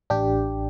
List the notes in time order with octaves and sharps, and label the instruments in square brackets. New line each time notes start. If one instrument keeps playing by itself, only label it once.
[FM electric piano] A1 D4 G4